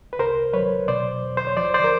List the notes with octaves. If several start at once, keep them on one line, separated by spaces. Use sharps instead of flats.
B4
C2 A#4 C5
F#3 B4 C#5
B2 C5 D5
E2
C5
C#5
F3 C5 D5
C5 D5
A#4